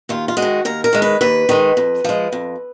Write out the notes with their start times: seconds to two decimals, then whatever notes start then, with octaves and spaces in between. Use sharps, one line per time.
0.09 D#2 F4
0.28 F4
0.37 G#3 F#4
0.42 D#3
0.65 D#2 A#4
0.84 A#4
0.93 D#3 G#3
1.02 B4
1.21 D#2 B4
1.49 D#3 G#3
1.77 F2
2.04 F3 G#3
2.33 F2